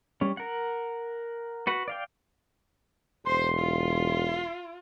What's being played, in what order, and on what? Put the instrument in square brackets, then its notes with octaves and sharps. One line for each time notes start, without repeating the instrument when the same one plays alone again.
[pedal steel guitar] G3 C#4
A#4 F#5
F#4 B4 F#5
D5 F5 G5
[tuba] E1 [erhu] C5 [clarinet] C6
[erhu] F4